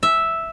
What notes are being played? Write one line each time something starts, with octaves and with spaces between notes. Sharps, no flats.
E5